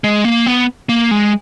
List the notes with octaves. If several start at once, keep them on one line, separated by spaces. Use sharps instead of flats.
G#3
A#3
B3
A#3
G#3